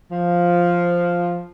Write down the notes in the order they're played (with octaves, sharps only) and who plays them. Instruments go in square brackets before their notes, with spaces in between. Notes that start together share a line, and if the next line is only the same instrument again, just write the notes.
[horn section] F3